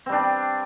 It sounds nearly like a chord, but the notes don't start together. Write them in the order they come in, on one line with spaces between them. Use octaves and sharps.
C4 G3 D4